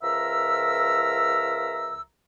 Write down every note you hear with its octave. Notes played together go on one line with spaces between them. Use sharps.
C#2 F3 A#4 E5 A#5 E6